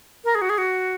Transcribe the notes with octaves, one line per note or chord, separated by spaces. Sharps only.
A#4
G#4
F#4
G#4
F#4